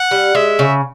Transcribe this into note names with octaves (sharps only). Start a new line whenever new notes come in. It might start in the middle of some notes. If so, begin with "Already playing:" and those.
Already playing: F#5
G3
G#3 E5
C#3